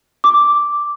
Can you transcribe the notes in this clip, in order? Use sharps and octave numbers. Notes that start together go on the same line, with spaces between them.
D6